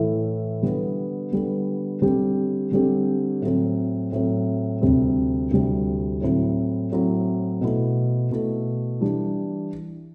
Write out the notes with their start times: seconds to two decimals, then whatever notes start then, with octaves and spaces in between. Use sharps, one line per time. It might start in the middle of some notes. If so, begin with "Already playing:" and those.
Already playing: A2 E3 A3 E4
0.62 D3 G3 B3
1.32 D3 G3 B3
2.02 D3 G3 C4 G4
2.71 D3 G3 C4 G4
3.42 A2 F#3 C4
4.12 A2 F#3 C4
4.81 D2 C3 G3 C4
5.51 D2 C3 G3 C4
6.21 A2 F#3 C4 E4
6.92 A2 F#3 C4 E4
7.61 B2 A3 E4
8.31 B2 A3 E4
9.01 E3 G3 D4 G4